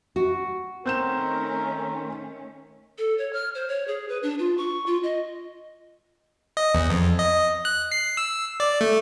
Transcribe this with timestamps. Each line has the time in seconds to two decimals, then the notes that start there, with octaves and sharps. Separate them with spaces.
0.16 F#4
0.86 D#3 A3 C4 C#4 A#4 G6 E7
2.98 A4
3.18 C#5
3.33 F6
3.55 C5
3.68 C#5
3.88 G#4
4.09 B4
4.23 D4
4.39 F4
4.58 C#6
4.86 F4
5.03 D#5
6.57 D#5
6.75 E2
6.90 F2
7.19 D#5
7.65 F#6
7.92 C7
8.17 E6
8.60 D5
8.81 A3